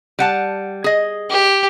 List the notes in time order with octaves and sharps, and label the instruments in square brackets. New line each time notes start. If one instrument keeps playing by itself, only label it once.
[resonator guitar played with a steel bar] G3 F#5 A5
G#4 D#5
[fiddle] G4